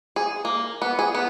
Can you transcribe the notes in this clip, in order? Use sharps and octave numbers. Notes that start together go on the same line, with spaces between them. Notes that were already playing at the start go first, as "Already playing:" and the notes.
G#4
A#3
B3
G#4
B3